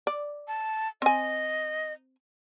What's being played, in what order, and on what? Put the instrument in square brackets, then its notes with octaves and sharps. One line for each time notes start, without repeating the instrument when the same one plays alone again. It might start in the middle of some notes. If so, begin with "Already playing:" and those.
[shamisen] D5
[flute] A5
[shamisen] C4 G#5 [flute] D#5